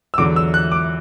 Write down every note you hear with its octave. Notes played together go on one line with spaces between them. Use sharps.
E6
E2 D3 F#3 D6
E6
F#6
D6